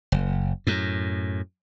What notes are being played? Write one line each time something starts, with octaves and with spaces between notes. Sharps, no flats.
F#1
F#2 A2